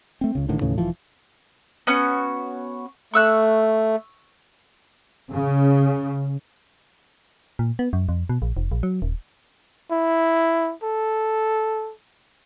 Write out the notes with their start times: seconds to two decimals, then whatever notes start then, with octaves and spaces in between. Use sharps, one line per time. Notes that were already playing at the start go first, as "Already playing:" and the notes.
0.21 A3 C4
0.35 C#2 C#3
0.49 A1 A2 D3 D#3
0.61 D#2 A2 C#3 E3
0.78 E1 E3 F3
1.87 B3 C#4 F#4
3.14 A3 C#6 E6 F#6
5.31 C#3
7.59 A#2
7.79 B3
7.93 F#2
8.09 F2
8.29 B2
8.42 A#1
8.57 F1
8.72 A#1
8.83 F#3
9.02 D#1
9.91 E4
10.83 A4